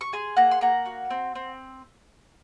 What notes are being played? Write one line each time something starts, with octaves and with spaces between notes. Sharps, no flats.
C#6
G#4 G#5 C6
A#3 F#5 A#5
C6
A#3 F#5 A#5
F#4
C4
C4